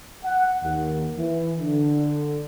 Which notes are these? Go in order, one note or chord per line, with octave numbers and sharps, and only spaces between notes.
F#5
D#2
E3
D3